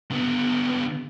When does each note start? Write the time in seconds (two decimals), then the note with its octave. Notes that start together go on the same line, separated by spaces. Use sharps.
0.11 D3 B3